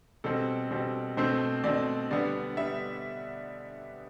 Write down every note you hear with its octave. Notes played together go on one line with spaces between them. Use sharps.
B2 G3 C4 A4
B2 G3 C4
B2 A3 C4 C5
B2 A3 C4 D5
D3 G3 B3 D5
G3 B3 E5